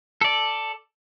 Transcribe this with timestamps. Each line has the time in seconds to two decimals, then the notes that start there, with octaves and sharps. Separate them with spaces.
0.21 A4 D5